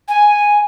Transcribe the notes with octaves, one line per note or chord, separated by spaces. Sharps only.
G#5